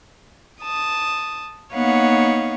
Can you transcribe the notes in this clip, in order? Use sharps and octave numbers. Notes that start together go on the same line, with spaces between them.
A5 D#6
A#3 B3 D#4 C#5 F5 F#5